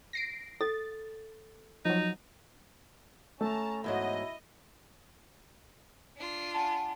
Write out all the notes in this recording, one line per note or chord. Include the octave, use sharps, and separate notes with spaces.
A#6 C7 D7
A4 A6
F3 F#3 D#4
A3 C#4 A5 A#5
E2 G#2 F#3 E4 D#5
D4 F4
F#5 G#5 A5